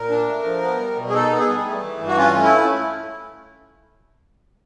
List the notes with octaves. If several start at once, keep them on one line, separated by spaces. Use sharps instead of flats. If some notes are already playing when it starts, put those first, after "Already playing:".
Already playing: A#2 A#4
D4
A3
F3
B3
G3
B2
G#4
D#4 A4
B3
G#4
G3
A3
E3
G2
F#4
C#4 F4
A3
E4